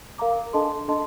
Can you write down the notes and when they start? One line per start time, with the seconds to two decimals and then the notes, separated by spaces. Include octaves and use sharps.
0.18 A#4 F5 A#5 D6
0.53 D4 A4 D#5 A5 C6
0.88 D4 A4 D#5 A5 C6